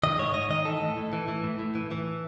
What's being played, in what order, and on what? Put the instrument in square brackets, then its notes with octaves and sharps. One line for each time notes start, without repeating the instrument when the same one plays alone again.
[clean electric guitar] D#3 D#5
G#2 C#5
G#2 D#5
D#3 D#5
E3 A4
A2
A2
E3
E3
A2
A2
E3
E3